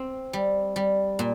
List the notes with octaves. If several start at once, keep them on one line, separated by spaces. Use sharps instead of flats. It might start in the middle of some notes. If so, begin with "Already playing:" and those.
Already playing: C4
G3
G3
A#2